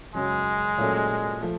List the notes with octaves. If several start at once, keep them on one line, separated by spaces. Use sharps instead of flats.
F#2 C#3 F#3 G#3
A#2 F#3 A3 C#4
F3 A3